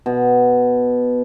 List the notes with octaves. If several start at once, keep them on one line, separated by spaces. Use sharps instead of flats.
B2